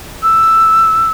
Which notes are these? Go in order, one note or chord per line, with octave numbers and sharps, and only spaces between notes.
E6